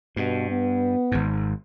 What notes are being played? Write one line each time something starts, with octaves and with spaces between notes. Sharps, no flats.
G2 B2
B3
G#1 G#2